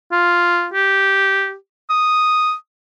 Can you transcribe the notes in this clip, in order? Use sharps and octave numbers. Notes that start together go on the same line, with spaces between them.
F4
G4
D#6